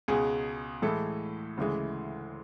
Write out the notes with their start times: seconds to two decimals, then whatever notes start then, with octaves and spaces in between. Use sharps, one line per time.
0.08 C#2 B2 G#3 G#4
0.82 A2 E3 G#3 A4
1.58 D2 C#3 E3 G#3